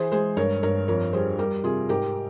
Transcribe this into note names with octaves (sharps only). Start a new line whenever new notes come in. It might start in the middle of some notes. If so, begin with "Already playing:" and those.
Already playing: E3 G#4 C5
G#3 G#4 C5
G2 A#4 C#5
G2 A#4 C#5
F2 A#4 C#5
G3 G#4 C5
G3 G4 A#4
C3 F4 G#4
G#2 G4 A#4